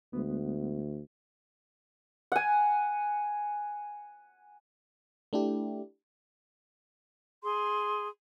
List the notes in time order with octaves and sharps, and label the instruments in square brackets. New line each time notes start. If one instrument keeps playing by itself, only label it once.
[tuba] D2 [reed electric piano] G#3 B3
[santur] F#5 G#5
[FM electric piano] A3 D4 E4 G4
[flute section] G#4 C6